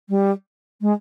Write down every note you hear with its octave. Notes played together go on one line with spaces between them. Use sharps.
G3
G#3